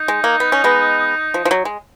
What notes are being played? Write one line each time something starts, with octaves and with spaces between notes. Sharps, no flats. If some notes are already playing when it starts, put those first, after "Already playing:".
Already playing: D#4
G#3
A#3
B3
C#4
G#3 B3
F3
F3
F#3
G#3